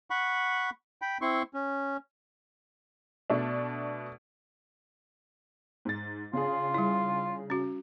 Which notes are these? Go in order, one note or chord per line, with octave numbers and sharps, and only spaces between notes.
F#5 B5 C#6
G5 B5
C4 E4 C6 C#6
C#4
B2 A3 D4
G#2 A6
C#3 D4 F4 G#4
G3 E4
C#4 F#4